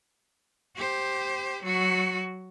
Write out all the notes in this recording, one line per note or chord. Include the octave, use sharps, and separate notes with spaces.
G4 C5
F#3 F#4